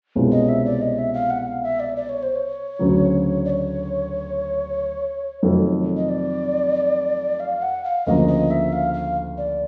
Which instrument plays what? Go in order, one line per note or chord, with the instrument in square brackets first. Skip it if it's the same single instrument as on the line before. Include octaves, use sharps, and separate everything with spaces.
[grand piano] C2 B2 G#3 C#4 F4
[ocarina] D#5
E5
D5
D#5
E5
F5
F#5
F5
E5
D5
D5
C#5
C5
C#5
[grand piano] D2 C#3 F#3
[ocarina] D5
C#5
[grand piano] F2 C3 D#3 F#3 A3
[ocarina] D#5
D5
F5
F#5
F5
[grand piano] D2 C#3 F3 A#3 [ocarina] D#5
[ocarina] D#5
E5
F5
F5
D5